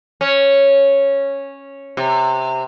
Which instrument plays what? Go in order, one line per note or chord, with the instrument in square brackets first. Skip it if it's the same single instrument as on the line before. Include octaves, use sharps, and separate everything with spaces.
[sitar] C#4
C3